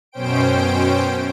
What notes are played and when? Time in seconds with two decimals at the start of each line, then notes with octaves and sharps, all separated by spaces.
0.12 F#2 B2 C#4 C5 G5 D7